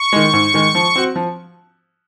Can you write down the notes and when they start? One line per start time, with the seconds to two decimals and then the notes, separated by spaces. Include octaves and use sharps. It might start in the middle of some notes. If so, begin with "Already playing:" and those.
Already playing: C#6
0.13 D#3 G#3
0.33 G#2
0.54 D#3 G#3
0.75 F3
0.96 C4 F#4
1.16 F3